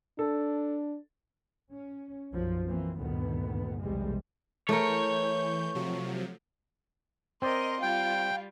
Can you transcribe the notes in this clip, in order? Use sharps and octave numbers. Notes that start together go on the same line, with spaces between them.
D4 A4
C#4
B1 F#2 F3
E3 A#3 C4
D2 G2 A#2 D#3 B3
B1 E2 C3 G3 G#3
E3 A3 A#4 C#5 G6
C3 F3 F#3
C4 A#4 C5 D5 D#5 C6
G3 F4 G5